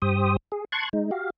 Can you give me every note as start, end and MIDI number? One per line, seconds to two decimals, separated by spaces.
0.02 0.37 43
0.02 0.37 67
0.02 0.37 72
0.02 0.37 87
0.52 0.65 68
0.72 0.89 81
0.72 0.89 84
0.72 0.89 85
0.72 0.89 90
0.72 0.89 92
0.93 1.11 56
0.93 1.11 63
1.11 1.30 66
1.11 1.30 67
1.11 1.30 77